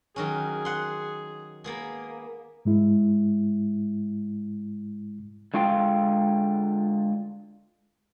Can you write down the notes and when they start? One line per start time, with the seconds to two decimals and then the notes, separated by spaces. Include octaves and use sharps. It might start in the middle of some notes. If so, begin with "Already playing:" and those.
0.16 D#3 F#3 C#4 G#4
0.65 F#5 C6
1.64 A#3 B3 G#4
2.65 G#2 G#3 E4
5.54 D3 G#3 F4 F5 G5